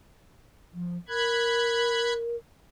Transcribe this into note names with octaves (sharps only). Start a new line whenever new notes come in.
F3
A#4 B5 F#6 G#6